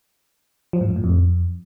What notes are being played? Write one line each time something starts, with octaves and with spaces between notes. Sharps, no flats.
F3
G#2
F#2
A2
F2